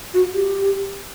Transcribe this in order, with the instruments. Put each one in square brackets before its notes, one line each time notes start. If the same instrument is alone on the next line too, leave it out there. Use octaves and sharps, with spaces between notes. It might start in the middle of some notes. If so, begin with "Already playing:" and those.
[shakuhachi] F#4
G4